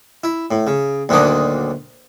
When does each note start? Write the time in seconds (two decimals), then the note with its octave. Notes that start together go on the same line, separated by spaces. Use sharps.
0.24 E4
0.51 A2
0.67 C#3
1.09 D2 A#2 D#3 F#3 D4 D#5